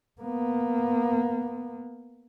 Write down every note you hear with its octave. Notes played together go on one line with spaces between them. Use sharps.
A#3 B3